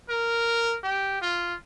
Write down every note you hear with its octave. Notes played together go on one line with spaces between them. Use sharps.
A#4
G4
F4